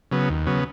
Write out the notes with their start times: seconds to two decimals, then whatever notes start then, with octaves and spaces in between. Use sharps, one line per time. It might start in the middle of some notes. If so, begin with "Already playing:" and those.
0.11 C#3 F#3 B3
0.29 D#2
0.46 C#3 F#3 B3